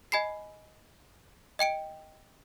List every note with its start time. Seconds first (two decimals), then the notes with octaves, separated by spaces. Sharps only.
0.12 D#5 G#5 B5 C7
1.59 D#5 G5 C#7 D7